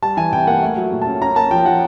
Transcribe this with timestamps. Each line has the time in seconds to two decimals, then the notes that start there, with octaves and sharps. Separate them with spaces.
0.02 G3 A5
0.17 E3 G#5
0.32 C3 G5
0.47 A#3 F#5
0.62 A3
0.77 F#3
0.92 A#2
1.02 A5
1.07 C#4
1.22 C#4 A#5
1.36 A#3 A5
1.51 F3 G5
1.66 F3 F#5